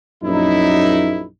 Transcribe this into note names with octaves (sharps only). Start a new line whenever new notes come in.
A#1 F#2 D#4 E4